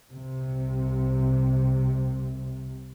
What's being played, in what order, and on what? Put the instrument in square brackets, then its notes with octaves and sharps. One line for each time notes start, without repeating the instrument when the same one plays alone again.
[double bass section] C2 C3